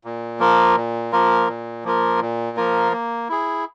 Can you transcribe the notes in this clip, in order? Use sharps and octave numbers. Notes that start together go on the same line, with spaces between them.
A#2
F3 A#3 F4 A#4
A#2
F3 A#3 F4 A#4
A#2
F3 A#3 F4 A#4
A#2
F3 A#3 F4 A#4
A#3
E4 G#4